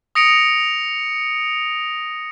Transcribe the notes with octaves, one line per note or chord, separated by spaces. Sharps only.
D#6 A#6 C#7 D7 F7